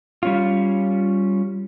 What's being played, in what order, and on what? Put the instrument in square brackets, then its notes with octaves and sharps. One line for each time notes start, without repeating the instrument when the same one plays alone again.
[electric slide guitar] G3 C#4 F4